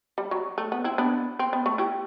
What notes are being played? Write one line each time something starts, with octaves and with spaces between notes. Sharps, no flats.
G3
F#3
A3
B3
C4 E4
B3 D4
C4
B3
A3
E4 G4